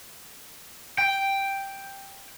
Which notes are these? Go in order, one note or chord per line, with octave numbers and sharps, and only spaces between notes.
G5